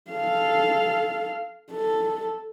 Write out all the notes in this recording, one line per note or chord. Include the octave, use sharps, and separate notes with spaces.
A4 F5
A4